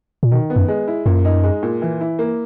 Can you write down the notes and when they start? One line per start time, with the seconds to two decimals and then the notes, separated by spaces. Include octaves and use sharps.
0.23 A#2
0.31 B2 D#3
0.50 B3
0.56 F#2
0.68 G#3
0.88 E4
1.06 F#2 A#2
1.25 D#4
1.43 G#3
1.63 A#2
1.82 E3
2.01 E4
2.19 A#3